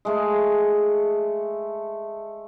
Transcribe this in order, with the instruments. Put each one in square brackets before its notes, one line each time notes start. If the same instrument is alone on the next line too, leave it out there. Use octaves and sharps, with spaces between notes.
[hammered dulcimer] G#3 A3 F5